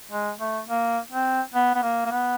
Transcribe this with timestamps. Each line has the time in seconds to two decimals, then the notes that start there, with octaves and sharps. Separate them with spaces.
0.11 G#3
0.40 A3
0.69 A#3
1.11 C4
1.54 B3
1.75 B3
1.83 A#3
2.06 A#3
2.11 B3